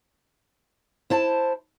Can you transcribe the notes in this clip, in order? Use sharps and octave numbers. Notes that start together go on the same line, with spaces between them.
E4 C5 A5